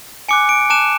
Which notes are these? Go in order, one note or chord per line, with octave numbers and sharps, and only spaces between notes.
G#5 D6 F#6 C#7
D7
A5 D6 F#6 E7